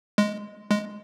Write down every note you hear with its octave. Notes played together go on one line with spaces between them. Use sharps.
G#3
G#3